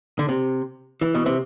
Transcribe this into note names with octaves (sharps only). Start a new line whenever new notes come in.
D3
C3
E3
B2
C3